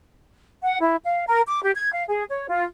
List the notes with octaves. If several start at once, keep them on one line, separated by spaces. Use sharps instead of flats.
F#5
E4
F5
A#4
D6
G4
G#6
F5
G#4
C#5
F4